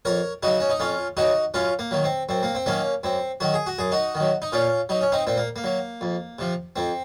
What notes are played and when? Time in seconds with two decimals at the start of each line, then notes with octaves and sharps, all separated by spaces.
0.05 F2 A#4 C#5
0.43 C#3 F#3 D#4 F#4
0.60 C#4
0.70 D#4
0.80 F2 C#4 F4
1.17 C#3 F#3 D#4 F#4
1.54 F#2 C#4 F4
1.79 A#3
1.91 D#3 F#3
2.04 C4
2.29 F#2 C4
2.43 A#3
2.55 C4
2.66 D#3 F#3 A#3 C#4
3.03 F#2 C4
3.40 D#3 F#3 F#4
3.54 G#4
3.67 F#4
3.79 F#2 G#4
3.92 D#4 F#4
4.15 D#3
4.20 F#3
4.42 D#4
4.52 A#2 C#4 F4
4.89 F#3 D#4
5.01 C#4
5.12 C4 D#4
5.27 A#2 C4
5.37 A#3
5.56 A#3
5.64 F#3
6.01 F2
6.39 C3 F3
6.76 F2 C4